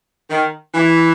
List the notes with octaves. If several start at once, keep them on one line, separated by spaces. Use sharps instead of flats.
D#3
E3